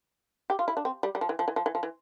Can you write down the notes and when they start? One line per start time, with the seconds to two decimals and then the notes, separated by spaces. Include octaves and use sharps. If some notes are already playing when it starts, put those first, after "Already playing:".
0.50 G4
0.59 F4
0.68 E4
0.77 D4
0.85 C4
1.03 G3
1.15 G3
1.21 F3
1.29 E3
1.39 F3
1.48 E3
1.56 F3
1.66 E3
1.75 F3
1.83 E3